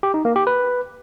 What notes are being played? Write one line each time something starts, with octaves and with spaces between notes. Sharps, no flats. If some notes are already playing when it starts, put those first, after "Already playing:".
G4
D#4
A#3
G4
B4